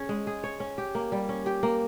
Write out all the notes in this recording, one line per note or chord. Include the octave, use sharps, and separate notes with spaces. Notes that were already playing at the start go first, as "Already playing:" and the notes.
Already playing: C#4 G#4 C#5
G#3
G#4
C#5
C#4
G4
A#3
G3
C#4
G4
A#3